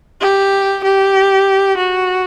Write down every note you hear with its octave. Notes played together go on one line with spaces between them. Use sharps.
G4
G4
F#4